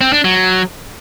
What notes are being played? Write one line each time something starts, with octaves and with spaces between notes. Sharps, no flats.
C4
D4
F#3